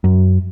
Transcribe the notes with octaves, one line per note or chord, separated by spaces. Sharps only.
F#2